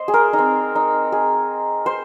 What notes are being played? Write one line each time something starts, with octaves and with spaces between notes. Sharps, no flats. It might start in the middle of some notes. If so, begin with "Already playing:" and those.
Already playing: C5 D#5
G#4
A#4
D#4
C4
D#4
G#4
C5